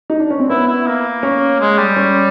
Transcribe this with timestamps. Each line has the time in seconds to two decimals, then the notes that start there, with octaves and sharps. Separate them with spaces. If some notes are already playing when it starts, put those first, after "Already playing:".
0.10 D#4
0.20 D4
0.30 C#4
0.40 C4
0.50 B3 E4
0.68 E4
0.87 A#3
1.23 C#4
1.60 G#3
1.78 G3
1.96 C#4